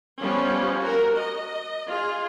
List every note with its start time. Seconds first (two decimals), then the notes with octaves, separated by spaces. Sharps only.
0.21 F3 G3 B3 C#4
0.81 F#4 A#4
1.16 D#5
1.86 F4 G#4